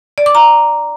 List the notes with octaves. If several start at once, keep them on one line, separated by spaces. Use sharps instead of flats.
D5
D6
A#5